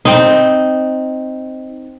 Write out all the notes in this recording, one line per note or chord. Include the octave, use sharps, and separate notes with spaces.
C4 D#4